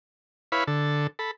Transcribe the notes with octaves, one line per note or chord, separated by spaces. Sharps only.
E4 B4 C#5 F5 B5
D3 A4
A4 B5